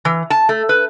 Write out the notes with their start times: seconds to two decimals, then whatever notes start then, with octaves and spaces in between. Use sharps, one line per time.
0.05 E3
0.30 A5
0.49 A3
0.69 B4